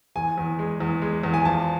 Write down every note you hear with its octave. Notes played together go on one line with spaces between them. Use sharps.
E2 G#5
E2
G#3
E2
G#3
E2
G#5
F3 A5